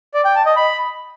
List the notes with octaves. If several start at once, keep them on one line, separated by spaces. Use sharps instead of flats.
D5
G5
A5
D#5
B5